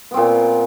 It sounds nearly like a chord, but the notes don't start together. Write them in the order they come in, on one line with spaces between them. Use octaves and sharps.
B3 C4 A#2